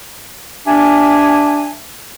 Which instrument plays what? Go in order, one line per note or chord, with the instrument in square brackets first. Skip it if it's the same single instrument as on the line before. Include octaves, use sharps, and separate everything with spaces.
[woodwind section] D4 G4 E5 G#5